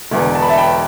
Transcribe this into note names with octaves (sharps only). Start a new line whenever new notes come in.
E1 E2 D3
A5
B5
E5 A5
G5 B5